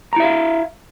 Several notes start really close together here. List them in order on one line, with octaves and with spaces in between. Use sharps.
A#5 E4 E5 F5